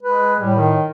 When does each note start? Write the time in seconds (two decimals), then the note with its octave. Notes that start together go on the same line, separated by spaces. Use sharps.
0.03 G#3 B4
0.39 A2 G3
0.56 D#3